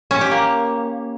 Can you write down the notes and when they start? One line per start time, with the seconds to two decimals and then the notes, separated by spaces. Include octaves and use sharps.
0.11 C#4
0.21 G4
0.31 A#3